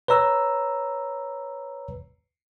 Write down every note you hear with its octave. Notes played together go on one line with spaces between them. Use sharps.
B4 C#5 A#5 E6